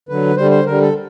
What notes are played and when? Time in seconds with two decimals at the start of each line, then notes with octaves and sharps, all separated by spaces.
0.09 D3 F#3 B4
0.37 D3 G3 C5
0.51 C5
0.66 D3 G3 A#4
0.81 A4